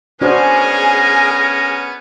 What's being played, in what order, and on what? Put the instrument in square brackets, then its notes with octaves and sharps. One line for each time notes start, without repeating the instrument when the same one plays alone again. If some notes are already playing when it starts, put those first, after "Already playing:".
[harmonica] B3 C#4 [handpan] D4 F#4 C5 [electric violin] G#4 G#5 [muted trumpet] A#4